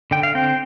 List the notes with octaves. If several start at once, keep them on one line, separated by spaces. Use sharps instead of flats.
D3 G5
F5
C4 G5